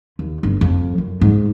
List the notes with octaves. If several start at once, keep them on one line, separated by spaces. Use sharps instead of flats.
D#2
G1
F2
F#2
G#2